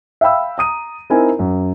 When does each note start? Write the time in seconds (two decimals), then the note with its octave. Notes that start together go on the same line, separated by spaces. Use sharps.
0.21 E5 F5 G5 B5 E6
0.58 A#5 D#6 D#7
1.10 C4 D#4 E4 A#4 G#5
1.39 F#2